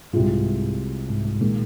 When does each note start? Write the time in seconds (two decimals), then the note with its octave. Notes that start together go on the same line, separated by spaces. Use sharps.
0.13 C2 G#2 C3 G#3 F4
1.10 G#2
1.25 G#2
1.41 A#2 D#3 G#3